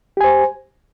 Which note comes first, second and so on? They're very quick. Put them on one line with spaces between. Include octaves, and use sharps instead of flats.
G4 G#5 C5